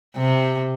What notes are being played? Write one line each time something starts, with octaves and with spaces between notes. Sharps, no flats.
C3